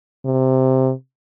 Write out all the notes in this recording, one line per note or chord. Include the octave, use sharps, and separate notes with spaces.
C3